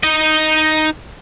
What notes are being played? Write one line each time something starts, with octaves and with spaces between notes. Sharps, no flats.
D#4 D#5